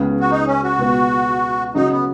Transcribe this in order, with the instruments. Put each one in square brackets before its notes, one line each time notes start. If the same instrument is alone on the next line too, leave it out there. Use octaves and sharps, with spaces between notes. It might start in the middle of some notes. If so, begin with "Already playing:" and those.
Already playing: [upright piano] C#2 C#3 B3
[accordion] F#4
D#4
C#4
F#4
[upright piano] C#2 B2 B3
[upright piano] C#3 F#3 C#4 F#4 [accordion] D#4
[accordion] B3